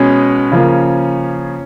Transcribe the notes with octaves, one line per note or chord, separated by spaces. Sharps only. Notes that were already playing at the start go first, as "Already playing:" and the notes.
Already playing: B2 G#3 B3 C#4
C#3 F3 A#3